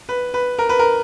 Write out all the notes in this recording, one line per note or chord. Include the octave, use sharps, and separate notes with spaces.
B4
B4
A#4
B4
A#4